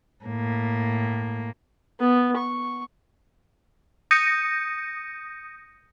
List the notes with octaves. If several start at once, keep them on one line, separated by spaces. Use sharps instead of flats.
A2 A#3
B3
C#6
D#6 G6 A#6 C#7 D#7